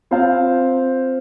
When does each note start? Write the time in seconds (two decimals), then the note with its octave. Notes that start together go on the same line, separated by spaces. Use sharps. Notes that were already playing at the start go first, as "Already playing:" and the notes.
0.11 C4 F4 C5 F5